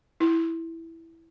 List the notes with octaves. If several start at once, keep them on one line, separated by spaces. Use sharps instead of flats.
E4